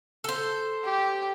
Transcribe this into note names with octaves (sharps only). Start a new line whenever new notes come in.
A4 C5
G4